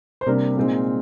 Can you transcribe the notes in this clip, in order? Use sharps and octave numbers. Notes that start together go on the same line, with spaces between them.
C5
C3 G3 A#3 D4 A#4
A#2 G#3 C4 D#4 A#4